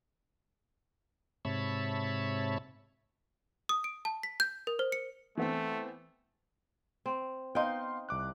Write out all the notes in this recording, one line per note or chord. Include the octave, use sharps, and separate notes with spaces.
G#2 C3 C#5 E5 A5 B5
D#6
D7
A5
B6
G6
A#4
C5
C#7
E3 A3 B3 C4
C4
B3 D#4 F5 G5 C6
C2 D6 F#6